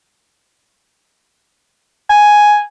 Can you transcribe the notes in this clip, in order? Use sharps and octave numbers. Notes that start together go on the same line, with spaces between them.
G#5